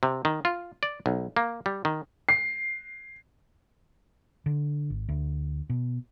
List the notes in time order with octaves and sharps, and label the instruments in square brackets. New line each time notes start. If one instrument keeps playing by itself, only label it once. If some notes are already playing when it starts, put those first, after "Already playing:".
[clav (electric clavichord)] C3
D#3
F4
D5
B1
A#3
G3
D#3
[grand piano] C7
[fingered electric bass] D3
G#1
D2
B2